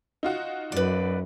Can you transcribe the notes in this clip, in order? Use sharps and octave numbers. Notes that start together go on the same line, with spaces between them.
D#4 F4 F#4
F#2 B4 D5